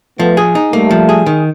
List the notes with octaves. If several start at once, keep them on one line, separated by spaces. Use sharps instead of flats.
F3 A3 B3
G#4
D#4
G3 A3 A#3
F3
G#4
D#3